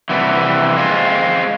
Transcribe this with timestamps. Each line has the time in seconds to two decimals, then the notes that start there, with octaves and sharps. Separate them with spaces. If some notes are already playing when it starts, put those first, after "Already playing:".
0.09 C3 E3 G3 B3
0.77 G#3 C4 F4